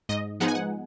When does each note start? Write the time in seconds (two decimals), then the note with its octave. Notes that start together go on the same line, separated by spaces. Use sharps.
0.09 G#2 D#5
0.40 F3 G#3 B3 D#4 F#5
0.48 G#5
0.55 F#5